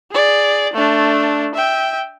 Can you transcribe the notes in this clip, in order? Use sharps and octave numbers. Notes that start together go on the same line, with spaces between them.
G#4 D5
A3 D4
E5 G5